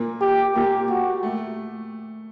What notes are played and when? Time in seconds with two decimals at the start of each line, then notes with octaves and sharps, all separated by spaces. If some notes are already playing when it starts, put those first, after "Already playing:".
Already playing: A#2 A#3
0.21 G4
0.55 A#2 A#3 G4
0.89 F#4
1.23 A3